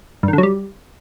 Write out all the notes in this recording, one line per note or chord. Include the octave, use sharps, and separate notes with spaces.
G2
D#3
D3
F#3
G3